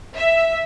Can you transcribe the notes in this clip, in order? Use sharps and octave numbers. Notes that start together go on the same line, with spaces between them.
E5